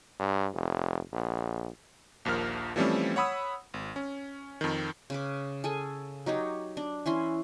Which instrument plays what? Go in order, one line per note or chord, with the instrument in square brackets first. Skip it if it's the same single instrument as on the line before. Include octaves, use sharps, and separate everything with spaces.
[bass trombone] G2
F1
A#1
[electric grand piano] A#1 D#2 F3 A#4 F6
E3 F3 G3 A3 C4 C#4
C#5 F#5 B5 D#6 E6
G#1
C#4
F2 D#3
[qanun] C#3 B4 D6
G#4 A4 G#5
F#3 D#4 G4 C#5
D4
E3 C#4 E4 C6